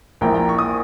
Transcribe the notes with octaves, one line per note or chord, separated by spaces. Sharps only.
A#1 A#2 A#3 E4 G5 A#5
G5 A#5
C#6
D#6